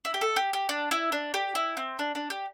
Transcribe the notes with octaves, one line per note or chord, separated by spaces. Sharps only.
E4
G4
A4
G4
G4
D4
E4
D4
G4
E4
C4
D4
D4
G4